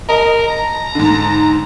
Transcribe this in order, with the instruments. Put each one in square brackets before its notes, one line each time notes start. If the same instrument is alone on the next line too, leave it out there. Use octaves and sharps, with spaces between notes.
[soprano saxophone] A#4 [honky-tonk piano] D#5
[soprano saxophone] A#5
[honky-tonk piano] G#2 D3